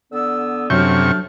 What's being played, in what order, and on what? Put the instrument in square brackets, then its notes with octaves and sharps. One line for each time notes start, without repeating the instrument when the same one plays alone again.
[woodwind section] D3 B3 E6
[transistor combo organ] F#2 C3 C#6 [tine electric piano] F#3 G6 [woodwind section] A3 D4 F6